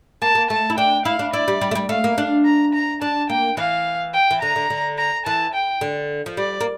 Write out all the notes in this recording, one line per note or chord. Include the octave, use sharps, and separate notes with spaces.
A#3 A5
A#3
A3 A5
E4
D4 G5
E4 F5
D4
E4 D5
G3
G3
A3
G3
A3 F5
A#3
D4
A#5
A#5
D4 A5
A#3 G5
E3 F5
G5
E3
D3 A#5
D3
D3
A#5
E3 A5
G5
D3
F3
G3 D5
A#3